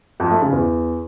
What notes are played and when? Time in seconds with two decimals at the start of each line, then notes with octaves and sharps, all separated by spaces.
0.20 F2
0.31 A3
0.41 C#3
0.52 E2